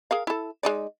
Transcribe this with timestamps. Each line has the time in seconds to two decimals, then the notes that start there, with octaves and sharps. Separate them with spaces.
0.11 G#4 A#4 F5
0.27 E4 A4
0.63 G#3 D#4 D5